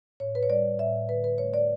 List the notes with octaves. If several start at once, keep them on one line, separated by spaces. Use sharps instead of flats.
A2 C#5
B4
C#5
G3 D5
A2 E5
D3 B4
B4
A3 C#5
D5